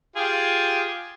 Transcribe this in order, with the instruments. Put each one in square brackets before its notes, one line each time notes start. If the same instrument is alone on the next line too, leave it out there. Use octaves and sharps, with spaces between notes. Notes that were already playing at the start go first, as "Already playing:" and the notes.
[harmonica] F4 G4 G#4